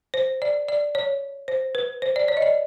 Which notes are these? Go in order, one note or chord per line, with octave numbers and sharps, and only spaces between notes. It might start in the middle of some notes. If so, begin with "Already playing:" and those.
C5
D5
D5
C#5
C5
B4
C5
D5
C#5
D#5
D5